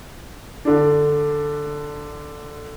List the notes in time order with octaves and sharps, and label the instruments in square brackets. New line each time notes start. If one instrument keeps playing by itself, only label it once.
[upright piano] D3 D4